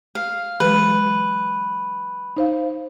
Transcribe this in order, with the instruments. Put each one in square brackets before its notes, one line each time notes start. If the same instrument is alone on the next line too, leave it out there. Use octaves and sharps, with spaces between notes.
[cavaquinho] F5
[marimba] E3 F#3 G#3 [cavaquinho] B4
[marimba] D#4 C5 F5